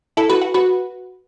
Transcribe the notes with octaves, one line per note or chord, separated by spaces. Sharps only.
E4 A4
F#4 B4
F#4
F#4 B4